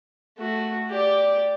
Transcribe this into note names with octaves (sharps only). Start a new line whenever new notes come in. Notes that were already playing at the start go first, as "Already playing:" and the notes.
A3 F#4
G4 D5